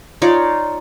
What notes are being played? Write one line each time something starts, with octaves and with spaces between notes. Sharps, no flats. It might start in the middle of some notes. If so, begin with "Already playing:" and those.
D#4 F4 C#5 D5